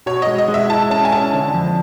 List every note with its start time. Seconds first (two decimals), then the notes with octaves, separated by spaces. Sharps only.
0.06 B2 C#5
0.22 G#3 D#5
0.38 D#5
0.48 G#3
0.54 E5
0.69 E4 A5
0.90 C#4 A5
1.05 G#5
1.11 C#4 A5
1.33 D3
1.54 F2